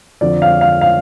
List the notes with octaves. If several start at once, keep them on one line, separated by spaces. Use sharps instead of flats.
F2 D3 F3 D5
F5
F5
F5